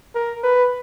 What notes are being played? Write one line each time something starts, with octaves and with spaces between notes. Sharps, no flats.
A#4
B4